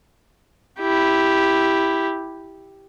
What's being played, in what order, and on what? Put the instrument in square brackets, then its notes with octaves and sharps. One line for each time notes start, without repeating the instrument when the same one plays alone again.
[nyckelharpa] E4 G4